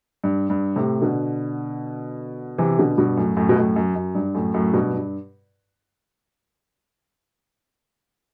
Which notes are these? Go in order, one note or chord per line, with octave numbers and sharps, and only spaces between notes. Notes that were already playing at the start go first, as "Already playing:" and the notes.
G2
G2
A2 C3
B2 D3
C3 E3
B2 D3
G2 B2
F#2 A2
F#2 A2
B2
F#2 A2
F#2
F#2
G2
F#2 A2
F#2 A2
G2 B2
G2